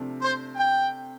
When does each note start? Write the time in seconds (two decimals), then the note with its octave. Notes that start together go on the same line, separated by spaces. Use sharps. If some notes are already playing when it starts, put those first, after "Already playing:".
Already playing: C3 F3 A3 D4
0.21 C5
0.56 G5